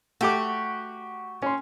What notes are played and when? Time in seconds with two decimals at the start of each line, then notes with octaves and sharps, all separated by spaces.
0.21 A3 F#4 G4 D6
1.42 C#4 C6